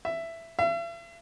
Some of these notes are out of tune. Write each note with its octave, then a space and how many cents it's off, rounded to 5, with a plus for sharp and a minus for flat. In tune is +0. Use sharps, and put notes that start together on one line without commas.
E5 +10
E5 +45